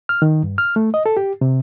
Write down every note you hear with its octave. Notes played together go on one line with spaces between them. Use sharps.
F6
D#3
G2
F6
A3
D#5
A4
G4
C3